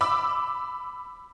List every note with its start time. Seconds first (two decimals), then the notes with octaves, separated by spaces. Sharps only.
0.01 B5 D6 E6